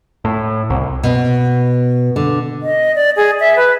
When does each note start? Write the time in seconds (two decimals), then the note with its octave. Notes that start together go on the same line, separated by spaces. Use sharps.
0.25 A2
0.70 C2
1.03 B2
2.16 D3
2.62 D#5
2.95 D5
3.16 G#4
3.40 E5
3.56 B4